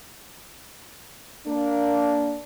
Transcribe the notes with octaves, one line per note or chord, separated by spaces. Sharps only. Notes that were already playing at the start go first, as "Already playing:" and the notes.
A#3 D4